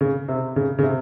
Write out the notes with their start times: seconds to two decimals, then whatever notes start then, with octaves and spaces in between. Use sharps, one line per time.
0.01 C#3
0.28 C3
0.56 C#3
0.78 C#3
0.83 C3